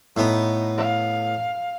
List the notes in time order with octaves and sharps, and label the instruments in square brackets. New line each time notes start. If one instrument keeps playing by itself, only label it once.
[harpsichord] A2 B3 [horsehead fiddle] D#4
[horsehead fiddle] F5